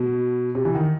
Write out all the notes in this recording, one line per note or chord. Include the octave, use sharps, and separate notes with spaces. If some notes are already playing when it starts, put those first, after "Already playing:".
Already playing: B2
C3
E3
D#3